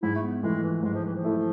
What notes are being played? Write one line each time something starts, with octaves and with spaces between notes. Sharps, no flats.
G#2 E4
A3
B3
E3 G#3 A3 E4
E3
G#2 G#3
F3
E3
F3
E3 A3 E4